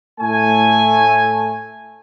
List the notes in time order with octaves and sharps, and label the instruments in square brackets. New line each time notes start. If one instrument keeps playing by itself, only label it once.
[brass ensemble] A2 A3 G#5